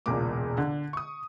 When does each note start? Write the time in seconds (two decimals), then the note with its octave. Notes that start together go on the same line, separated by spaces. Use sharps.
0.06 E1 C#2 A#2 G#3 A#3 D6
0.58 D3
0.93 C#6 D#6